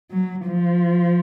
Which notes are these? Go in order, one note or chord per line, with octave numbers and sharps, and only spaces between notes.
F#3
F3